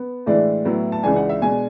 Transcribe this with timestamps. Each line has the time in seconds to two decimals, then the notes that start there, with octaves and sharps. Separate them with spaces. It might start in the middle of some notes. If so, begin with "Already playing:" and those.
Already playing: B3
0.26 A2 E3 G#3 D4 D5
0.65 A2 F#3 B3 E4
0.92 A5
1.03 C#2 C#3 E3 G#3 D4 G#5
1.16 F#5
1.29 E5
1.41 B2 G#3 D4 G#5